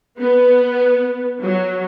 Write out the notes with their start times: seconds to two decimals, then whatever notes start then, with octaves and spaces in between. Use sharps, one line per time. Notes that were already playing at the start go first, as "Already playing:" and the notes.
0.19 B3
1.43 F#3